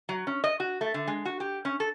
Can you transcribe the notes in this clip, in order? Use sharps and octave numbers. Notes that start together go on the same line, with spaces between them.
F#3
C#4
D#5
F#4
A3
D3
G#3
F#4
G4
C#4
A4